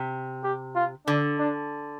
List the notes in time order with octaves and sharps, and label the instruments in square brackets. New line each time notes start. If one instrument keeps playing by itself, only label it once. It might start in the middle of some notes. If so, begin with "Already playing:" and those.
Already playing: [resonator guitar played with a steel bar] C3
[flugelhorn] G4
F4
[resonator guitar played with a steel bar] D3 [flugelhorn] D4
[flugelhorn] D4